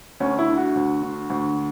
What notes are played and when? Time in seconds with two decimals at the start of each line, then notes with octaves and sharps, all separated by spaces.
0.20 D2 C#4
0.39 E4
0.48 D3
0.58 F#4
0.75 D2
1.03 D3
1.30 D2